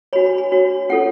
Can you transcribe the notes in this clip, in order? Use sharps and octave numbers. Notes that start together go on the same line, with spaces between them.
D4 F#4 C#5 B5
B5
B5
D4 F#4 C#5
C#4 F4 A4 C#5 F#5